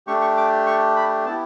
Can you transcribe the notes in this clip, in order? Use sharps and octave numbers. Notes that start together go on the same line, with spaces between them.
A3 D4 G4 C#6
C#6
D6
C#6
B5
B3 E4 G4 A5